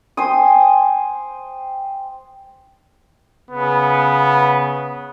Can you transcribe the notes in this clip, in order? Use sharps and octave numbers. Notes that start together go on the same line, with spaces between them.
C5 G5 G#5 D#6
C#3 B3